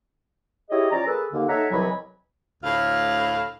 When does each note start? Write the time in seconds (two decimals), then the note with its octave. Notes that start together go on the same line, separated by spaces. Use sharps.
0.70 E4 G4 G#4 C#5 D#5
0.91 F3 C#4 D5 A#5
1.06 A#3 G#4 A4 B4
1.33 D#2 D3 A#3
1.48 D#4 A4 C#5 E5 F#5 A#5
1.71 C2 E3 F#3 D#5 G#5 B5
2.64 D2 A2 F5